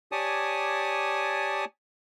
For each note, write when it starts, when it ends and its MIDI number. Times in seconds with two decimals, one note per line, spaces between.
0.12 1.65 67
0.12 1.65 73
0.12 1.65 74
0.12 1.65 80
0.12 1.65 81
0.12 1.65 87